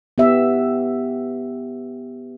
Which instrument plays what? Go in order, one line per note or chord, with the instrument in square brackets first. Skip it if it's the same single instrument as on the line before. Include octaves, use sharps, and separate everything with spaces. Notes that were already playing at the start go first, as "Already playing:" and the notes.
[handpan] B3 G4 E5